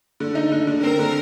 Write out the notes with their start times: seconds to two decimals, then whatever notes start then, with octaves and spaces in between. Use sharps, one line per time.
0.20 D3
0.35 D#4
0.52 D3
0.67 D3
0.82 C4 A#4
0.99 D3